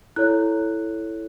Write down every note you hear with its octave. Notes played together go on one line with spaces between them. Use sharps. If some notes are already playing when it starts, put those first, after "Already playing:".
E4 A4 C#5 F#6